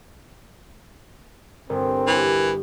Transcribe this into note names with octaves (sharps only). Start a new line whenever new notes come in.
G1 C4 A#4
E3 G4